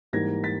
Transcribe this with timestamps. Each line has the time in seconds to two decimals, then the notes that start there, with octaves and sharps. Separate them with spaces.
0.13 G#2 E3 G3 A#3 G#6 A#6
0.44 A6 B6